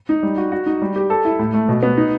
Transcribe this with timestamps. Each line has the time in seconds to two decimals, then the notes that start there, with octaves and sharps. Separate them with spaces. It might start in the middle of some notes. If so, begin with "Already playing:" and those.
0.09 D#4
0.23 G3
0.37 F#4
0.52 F#4
0.66 D#4
0.82 G3
0.96 G4
1.10 A4
1.25 E4
1.39 A2
1.54 A3
1.69 B2
1.83 B3
1.97 D#4